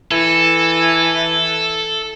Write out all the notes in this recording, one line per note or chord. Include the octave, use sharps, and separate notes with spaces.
E3 A4